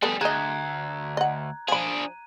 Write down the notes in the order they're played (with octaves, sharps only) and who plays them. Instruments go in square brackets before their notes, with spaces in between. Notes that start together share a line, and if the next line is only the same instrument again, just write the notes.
[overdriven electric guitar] G3 G#4 [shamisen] B3 A4 B4
[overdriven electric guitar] D2 [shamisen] G#4 D#5 [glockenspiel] A#5 F#6 G#6
[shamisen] D#5 F#5
[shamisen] F3 B5 [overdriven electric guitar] D4 G#4 [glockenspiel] D#7